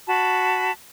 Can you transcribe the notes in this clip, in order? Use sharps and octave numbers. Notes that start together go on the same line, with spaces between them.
F#4 A5 B5